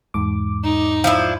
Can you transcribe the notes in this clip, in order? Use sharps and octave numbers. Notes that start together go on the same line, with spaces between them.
E2 G#2 D6
D#4
F3 D4 E4